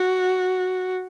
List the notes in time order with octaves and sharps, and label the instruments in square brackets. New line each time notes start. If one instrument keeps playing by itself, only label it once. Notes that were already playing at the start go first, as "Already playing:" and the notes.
Already playing: [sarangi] F#4